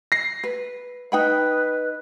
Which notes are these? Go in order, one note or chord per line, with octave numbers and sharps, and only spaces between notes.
A#6 C7
B4
D#4 B4 G5 B5